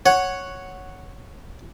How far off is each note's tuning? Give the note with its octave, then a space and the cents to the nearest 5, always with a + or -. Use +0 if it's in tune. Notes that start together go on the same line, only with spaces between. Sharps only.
C#5 +0 F#5 +0